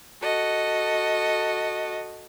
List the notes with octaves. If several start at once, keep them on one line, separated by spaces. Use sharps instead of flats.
F#4 A4 D#5